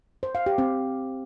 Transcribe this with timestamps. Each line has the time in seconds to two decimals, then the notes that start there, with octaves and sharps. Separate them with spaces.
0.23 C5
0.35 F5
0.46 G4
0.58 C4